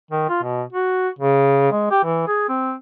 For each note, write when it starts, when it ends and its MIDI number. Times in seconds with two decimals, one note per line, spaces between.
0.11 0.24 51
0.29 0.41 65
0.43 0.62 47
0.73 1.09 66
1.19 1.70 49
1.71 1.90 56
1.91 2.04 67
2.04 2.24 52
2.27 2.45 68
2.49 2.74 60